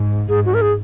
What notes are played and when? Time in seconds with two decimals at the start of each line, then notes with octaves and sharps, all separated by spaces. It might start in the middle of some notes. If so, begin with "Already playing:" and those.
Already playing: G#2
0.29 G#2 G#4
0.45 F#4
0.54 A#4
0.62 G#4